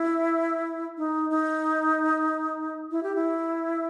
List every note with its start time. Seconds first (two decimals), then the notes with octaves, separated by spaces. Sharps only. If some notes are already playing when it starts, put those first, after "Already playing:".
Already playing: E4
0.97 D#4
1.30 D#4
2.91 E4
3.03 G4
3.15 E4